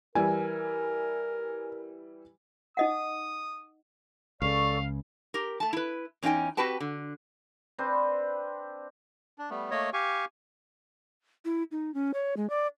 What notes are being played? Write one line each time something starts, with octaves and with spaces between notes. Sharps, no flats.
E3 G3 E4 A#4 G#5
D#4 D#5 F#5 D#6
C#2 C#3 A4 D5 F5 C#6
G4 A#4
A3 A5
E4 B4
E2 C#4 D#4 F4 G5 G#5
C4 F#4 G4 B4 G5 A5
D3
C4 D4 B4 C5
D4
G3 A3 B3
A3 A#3 C#5 D#5
G4 F5 G#5 C#6
E4
D#4
C#4
C#5
G#3
D5